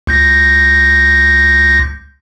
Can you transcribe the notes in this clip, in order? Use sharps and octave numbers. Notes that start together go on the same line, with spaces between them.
C#2 G6 A#6